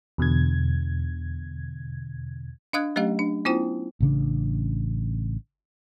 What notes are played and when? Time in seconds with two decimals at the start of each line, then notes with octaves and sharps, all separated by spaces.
0.18 E2 B2 D3 G#6
2.73 D4 D#5 F5 D#6 F#6 G#6
2.96 F#3 A3 C#4 G4 D#5 F5
3.19 D4
3.45 B3 C#4 E4 F4 C5 G5
4.00 A1 C#3 D4